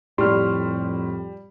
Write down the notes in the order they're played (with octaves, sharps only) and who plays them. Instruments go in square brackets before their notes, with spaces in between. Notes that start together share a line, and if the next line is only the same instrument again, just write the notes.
[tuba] F2 [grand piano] A2 [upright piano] G3 [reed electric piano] C6 C#6 F6